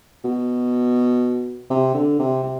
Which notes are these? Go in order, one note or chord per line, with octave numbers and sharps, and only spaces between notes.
B2
C3
D3
C3
C3